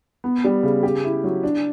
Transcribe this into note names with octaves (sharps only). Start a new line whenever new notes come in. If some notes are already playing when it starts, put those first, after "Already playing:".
B3
G3
C#3
G4
E4
F#3
D4